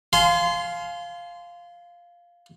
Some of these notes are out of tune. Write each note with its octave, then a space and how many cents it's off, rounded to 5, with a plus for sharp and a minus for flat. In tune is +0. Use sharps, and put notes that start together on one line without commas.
F5 +0 G#5 +40 C6 -20